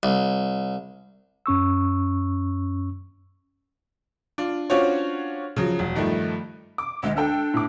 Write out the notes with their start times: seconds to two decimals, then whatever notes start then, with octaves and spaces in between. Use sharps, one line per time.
0.03 C2
1.46 F#2 C#4 C#6 E6
4.38 D4 F4
4.70 C#4 D4 F4 F#4 C5 C#5
5.56 C#3 F3 F#3
5.79 E1
5.95 G2 D#3 F3 A3
6.78 D6
7.03 D2 G#3
7.17 D4 A4 G5
7.54 A2 D6